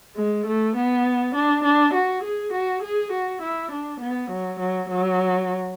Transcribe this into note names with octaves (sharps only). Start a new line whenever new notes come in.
G#3
A3
B3
D4
D4
F#4
G#4
F#4
G#4
F#4
E4
D4
B3
F#3
F#3
F#3